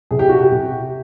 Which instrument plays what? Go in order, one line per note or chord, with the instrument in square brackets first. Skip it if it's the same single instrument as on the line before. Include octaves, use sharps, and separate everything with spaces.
[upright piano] C3 G#4
G4
F#4
G4
C3